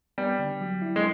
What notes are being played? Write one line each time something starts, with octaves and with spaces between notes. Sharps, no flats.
G3 B3
D3
F#3
E4
G#3